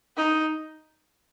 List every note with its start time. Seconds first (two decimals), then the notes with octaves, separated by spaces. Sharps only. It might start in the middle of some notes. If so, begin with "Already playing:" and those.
0.17 D#4